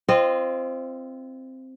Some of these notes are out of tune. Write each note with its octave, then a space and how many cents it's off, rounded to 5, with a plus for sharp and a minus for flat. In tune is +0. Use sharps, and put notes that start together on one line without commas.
C4 +0 F4 -30 D#5 -25